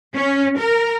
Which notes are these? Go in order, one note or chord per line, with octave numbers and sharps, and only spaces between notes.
C#4
A#4